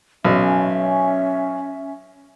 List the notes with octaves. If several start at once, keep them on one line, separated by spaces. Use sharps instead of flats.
B1 C#4 E5